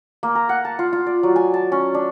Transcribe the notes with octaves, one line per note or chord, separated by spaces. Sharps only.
A#3
A#5
F#5
A5
F4
F4
D5
F#3
G#5
A5
C#4
D4